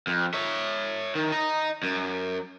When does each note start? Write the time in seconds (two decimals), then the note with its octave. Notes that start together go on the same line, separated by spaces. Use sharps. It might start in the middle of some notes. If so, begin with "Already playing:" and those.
0.07 F2
0.34 C#5 E5
1.15 D#3
1.32 D#5 A#5
1.83 F#2